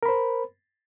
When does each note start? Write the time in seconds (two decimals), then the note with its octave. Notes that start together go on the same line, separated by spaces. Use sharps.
0.03 A#4
0.06 B5
0.09 C5